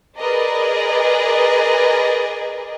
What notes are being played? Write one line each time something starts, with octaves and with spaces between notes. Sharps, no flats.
G#4 A#4 B4 D5 D#5